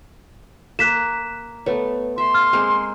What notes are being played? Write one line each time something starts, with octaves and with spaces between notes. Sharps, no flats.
A#3 F#6 B6 E7
A3 B3 B4 C#5
E5 C6
F6
G#3 A#3 C4